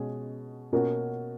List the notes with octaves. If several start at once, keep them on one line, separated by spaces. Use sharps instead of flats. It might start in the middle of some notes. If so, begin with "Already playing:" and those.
Already playing: B2 G#3 C#4 G#4
B2 A#3 C#4 F#4 A#4